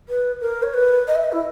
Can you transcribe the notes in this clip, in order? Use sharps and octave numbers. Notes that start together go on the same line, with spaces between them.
B4
A#4
C#5
B4
D#5
E5
D#5
E4